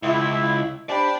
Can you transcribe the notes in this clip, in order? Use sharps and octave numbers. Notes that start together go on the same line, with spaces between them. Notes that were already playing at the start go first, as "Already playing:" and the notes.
C#2 E4
G4 C5 D5 A5 B5